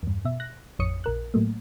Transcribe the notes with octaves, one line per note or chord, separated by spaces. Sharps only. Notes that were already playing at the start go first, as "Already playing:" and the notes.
E2 G2
B2 E5
F#6 A#6
A1 F2 C#5 D#6 C#7
A#1 A#4 F#6
A2 F#3 A3 A#3